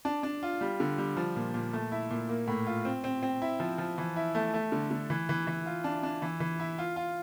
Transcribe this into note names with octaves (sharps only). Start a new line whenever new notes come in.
D4
D4
F4
G3
D3
G3
F3
A#2
A#2
A3
E4
A#2
A#3
A2
F4
C4
C4
C4
E4
F3
F3
E3
E4
A3
A3
D3
D3
E3
E3
E3
F4
D4
D4
E3
E3
E4
F4
F4